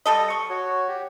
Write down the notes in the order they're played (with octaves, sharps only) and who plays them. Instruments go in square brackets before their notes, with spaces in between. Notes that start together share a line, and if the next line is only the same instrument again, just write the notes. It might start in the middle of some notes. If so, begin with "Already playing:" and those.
[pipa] G3 A4 D#5
C#6
[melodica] F#4 C#5
G4